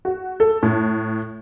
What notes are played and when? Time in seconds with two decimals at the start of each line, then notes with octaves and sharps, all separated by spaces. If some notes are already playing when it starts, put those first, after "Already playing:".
0.05 F#4
0.40 A4
0.63 A2